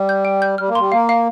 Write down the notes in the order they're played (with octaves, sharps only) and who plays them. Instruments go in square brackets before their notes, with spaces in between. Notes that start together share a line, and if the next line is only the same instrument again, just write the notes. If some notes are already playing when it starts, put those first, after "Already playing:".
Already playing: [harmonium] G3
[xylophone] G6
G5
G6
[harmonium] G3 [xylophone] F6
[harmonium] A#3
[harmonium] G3 [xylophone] C6
[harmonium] A#3 [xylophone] F5
[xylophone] F5